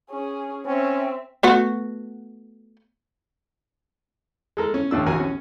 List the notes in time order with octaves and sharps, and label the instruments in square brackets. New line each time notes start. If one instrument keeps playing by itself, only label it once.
[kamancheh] C#4 G#4
[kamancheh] C4 E5 [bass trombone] C#4
[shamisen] A3 B3 F#4
[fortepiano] G#3 A4 A#4
C#4
D#2 A2 D4 E6
A#1 D#2 F#4 A#4 G#5
C#4